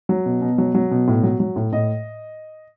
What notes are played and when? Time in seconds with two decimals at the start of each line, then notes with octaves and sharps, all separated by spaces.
0.09 F#3
0.26 B2
0.41 B2
0.58 F#3
0.75 F#3
0.91 B2
1.08 A2
1.23 F#3
1.40 F#3
1.56 A2
1.72 A2 D#5